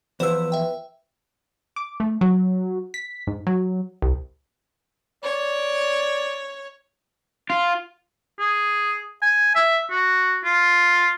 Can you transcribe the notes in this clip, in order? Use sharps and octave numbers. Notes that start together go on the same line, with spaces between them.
E2 F3 B4 C5 E6
E5 G5
D6
A3
F#3
B6
G#2
F#3
C2
C#5 D5
F4
G#4
G#5
E5
F#4
F4